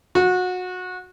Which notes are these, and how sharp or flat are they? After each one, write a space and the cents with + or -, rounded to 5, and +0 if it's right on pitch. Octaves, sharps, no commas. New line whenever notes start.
F#4 -25